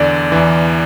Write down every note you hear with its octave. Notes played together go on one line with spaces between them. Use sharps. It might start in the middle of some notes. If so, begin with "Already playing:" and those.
Already playing: E2 D3 D5
E2 E3